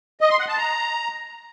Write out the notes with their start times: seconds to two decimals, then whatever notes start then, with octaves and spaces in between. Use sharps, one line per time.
0.21 D#5
0.30 C6
0.39 F#5
0.48 A5
0.58 A#5